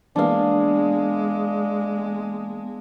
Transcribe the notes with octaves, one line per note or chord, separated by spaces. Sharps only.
E3 G#3 A#3 B3 D4 F5